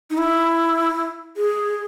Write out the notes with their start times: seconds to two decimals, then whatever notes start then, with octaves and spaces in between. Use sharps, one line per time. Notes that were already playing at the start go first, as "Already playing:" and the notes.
0.10 D#4
0.18 E4
1.37 G#4